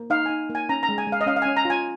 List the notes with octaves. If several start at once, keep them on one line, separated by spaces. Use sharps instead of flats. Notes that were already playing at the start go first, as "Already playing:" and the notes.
Already playing: A#3
D#4 F5
D#4 G#5
A#3
G#5
C#4 A#5
A#5
G#3
G#5
G#3
F5
D#5
C#4 F5
F5
C#4 G#5
A#5
F4 G#5